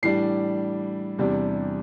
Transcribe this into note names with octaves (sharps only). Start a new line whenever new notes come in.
A2 E3 G3 D4 C7
E2 C3 G3 D4